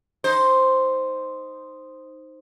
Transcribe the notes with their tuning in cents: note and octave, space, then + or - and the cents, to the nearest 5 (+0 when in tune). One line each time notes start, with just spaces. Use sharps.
D#4 +0 C5 +0